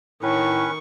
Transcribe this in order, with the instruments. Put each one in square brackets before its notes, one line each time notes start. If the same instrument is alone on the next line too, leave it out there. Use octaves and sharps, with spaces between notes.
[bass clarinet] A2 [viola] D#3 C#6 [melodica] C#4 B4